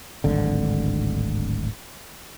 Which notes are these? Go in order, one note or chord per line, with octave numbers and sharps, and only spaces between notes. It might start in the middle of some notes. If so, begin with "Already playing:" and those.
D1 G#1 D3